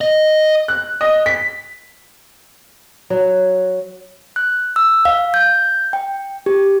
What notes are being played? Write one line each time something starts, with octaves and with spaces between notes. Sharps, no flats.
D#5
F#6
D#5
B6
F#3
F#6
E6
F5
G6
G5
G4